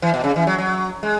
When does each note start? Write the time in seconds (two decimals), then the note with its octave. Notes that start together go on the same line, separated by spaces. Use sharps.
0.02 E3
0.14 B2
0.24 C#3
0.36 E3
0.47 F#3
0.58 F#3
1.03 G#3